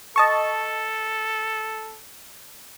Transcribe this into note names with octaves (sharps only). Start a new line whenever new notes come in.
A4 D#5 A5 C#6